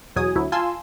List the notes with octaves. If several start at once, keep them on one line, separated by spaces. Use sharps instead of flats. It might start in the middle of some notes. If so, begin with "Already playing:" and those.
E2 B2 F#3 G#5 D#6
D2 F#3 E4
F4 G#5 A5 C6 E6